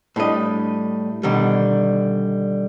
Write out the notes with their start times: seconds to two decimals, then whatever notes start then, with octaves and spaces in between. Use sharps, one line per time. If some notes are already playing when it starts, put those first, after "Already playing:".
0.16 A2 G3 D4 D#5
1.23 B2 D3 D#3 G3